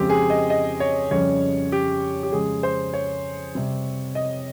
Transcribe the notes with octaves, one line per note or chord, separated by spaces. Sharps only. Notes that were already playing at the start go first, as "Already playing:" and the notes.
Already playing: F2 C#3 G#3 C4 G4
G#4
D#5
D#5
C#5
F2 C#3 G3 C#4 C#5
G4
G4
F2 C#3 G#3 G#4
C5
C#5
C3 G3 C4
D#5